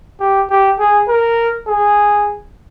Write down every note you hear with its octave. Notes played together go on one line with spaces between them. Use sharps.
G4
G4
G#4
A#4
G#4